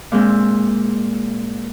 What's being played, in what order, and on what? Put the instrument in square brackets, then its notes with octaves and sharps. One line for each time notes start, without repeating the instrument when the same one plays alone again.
[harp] A#2 G#3 C4 E6